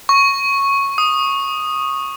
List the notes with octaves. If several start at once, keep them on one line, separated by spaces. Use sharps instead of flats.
C#6
D#6